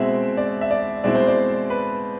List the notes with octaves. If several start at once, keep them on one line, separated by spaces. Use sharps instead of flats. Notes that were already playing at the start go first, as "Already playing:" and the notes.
Already playing: B2 G#3 C4 E4 E5
D5
E5
D5
B2 G#3 C4 E4 D5
C5
D5
B4